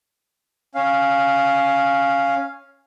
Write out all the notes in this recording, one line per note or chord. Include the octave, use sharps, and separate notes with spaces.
C#4 F5